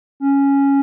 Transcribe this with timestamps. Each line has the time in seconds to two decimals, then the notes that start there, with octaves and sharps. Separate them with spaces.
0.20 C#4